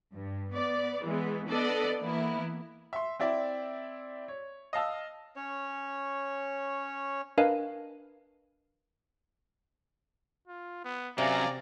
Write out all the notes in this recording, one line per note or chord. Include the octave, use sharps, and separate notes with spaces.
G2
B3 D5
E3 G#3 B3
B3 D4 A4 D5 D#5
E3 A#3 B3 E4
E5 C6
C4 E4 D5 E5
C#5
D#5 F5 A5 E6
C#4 C#5
D4 A#4 B4 D#5 F5 G#5
F4
B3
F#2 C3 D5 F5 G#5 A#5